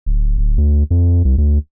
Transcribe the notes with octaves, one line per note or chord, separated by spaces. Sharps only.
D1
D1
D2
F2
C2
D2